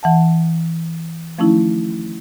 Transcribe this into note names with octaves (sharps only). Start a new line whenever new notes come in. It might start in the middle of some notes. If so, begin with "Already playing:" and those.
E3 F#5 A5
D#3 F3 A3 C#4 D#4 E4